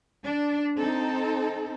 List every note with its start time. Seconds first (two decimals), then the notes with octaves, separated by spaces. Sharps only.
0.22 D4
0.77 C4 D#4 A4